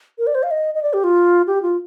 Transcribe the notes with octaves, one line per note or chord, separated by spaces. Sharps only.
A#4
D5
C5
F5
D#5
D#5
D5
G4
F4
G4
F4